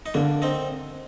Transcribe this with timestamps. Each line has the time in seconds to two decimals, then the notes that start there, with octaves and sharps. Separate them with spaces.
0.06 D#4
0.14 D3 A#3 D4
0.42 C4 D#4